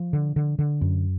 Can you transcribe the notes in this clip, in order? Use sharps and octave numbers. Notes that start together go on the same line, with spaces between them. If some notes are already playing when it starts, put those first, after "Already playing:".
Already playing: F3
D3
D3
D3
F#2